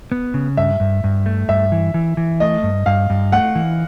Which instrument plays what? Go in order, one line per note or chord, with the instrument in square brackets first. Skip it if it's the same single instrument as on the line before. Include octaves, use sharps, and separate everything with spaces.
[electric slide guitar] B3
C#3
[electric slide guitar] G2 [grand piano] E5
[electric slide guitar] G2
G2
A3
[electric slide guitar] G2 [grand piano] E5
[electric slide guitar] E3
E3
E3
[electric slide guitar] A3 [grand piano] D#5
[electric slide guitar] G2
[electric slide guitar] G2 [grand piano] F5
[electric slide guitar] G2
[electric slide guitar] A3 [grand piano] F#5
[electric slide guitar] E3